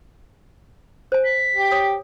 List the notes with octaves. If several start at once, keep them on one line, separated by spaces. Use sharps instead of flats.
C5 G#5
B6
G4
C#5 D#6